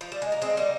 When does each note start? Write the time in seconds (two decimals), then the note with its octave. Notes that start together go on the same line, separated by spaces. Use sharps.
0.01 F3
0.12 G3
0.22 G#3
0.32 A#3
0.42 G#3 C4
0.57 G3 A#3